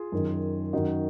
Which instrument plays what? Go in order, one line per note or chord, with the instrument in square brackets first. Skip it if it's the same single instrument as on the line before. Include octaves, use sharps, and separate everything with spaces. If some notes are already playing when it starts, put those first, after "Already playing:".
Already playing: [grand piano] F4 G#4
F#2 D#3
F#2 D#3 D#4 F#4